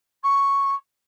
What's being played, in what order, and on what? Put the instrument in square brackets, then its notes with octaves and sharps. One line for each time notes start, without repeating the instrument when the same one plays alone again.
[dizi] C#6